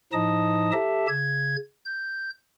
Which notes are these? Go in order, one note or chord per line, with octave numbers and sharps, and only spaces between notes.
A2 F3 D#4 D#5 A5 D#6
G4 A4 E5 A5
C#3 G#6
G6